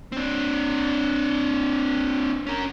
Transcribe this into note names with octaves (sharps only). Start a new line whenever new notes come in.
C4 D4
C#4 A#4